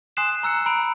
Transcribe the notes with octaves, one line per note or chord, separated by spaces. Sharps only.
G#5 C6 D#6 F#6 C7 E7
A#5 E6 F#6 C#7
A#5 B5 D7